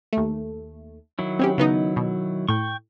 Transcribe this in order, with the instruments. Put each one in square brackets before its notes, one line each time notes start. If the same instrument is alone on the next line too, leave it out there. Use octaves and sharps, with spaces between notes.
[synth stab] D#2 A3
[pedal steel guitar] D#3 F#3 E4
[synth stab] C4 C#4 G4
C#3 B3 D#4
B2
[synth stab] A2 [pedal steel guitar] G5 C#6